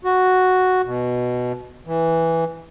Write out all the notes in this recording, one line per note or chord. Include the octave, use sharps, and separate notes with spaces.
F#4
B2
E3